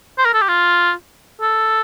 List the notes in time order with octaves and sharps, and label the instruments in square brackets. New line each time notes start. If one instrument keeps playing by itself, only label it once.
[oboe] C5
A#4
A4
G4
F4
A4